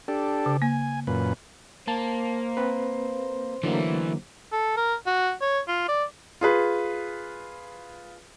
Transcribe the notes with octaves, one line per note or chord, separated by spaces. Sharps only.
D4 G4 A4
C#3
A#3 G#5
F#2 A#2 B4
A#3 C5 A5
C4 B4
D3 E3 F#3 A3 A#3
A4
A#4
F#4
C#5
F4
D5
F4 G#4 B4